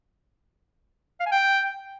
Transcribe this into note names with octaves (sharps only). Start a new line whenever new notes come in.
F5
G#5
G5